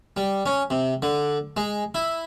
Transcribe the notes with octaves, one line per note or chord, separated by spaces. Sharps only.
G3
C#4
C3
D3
G#3
E4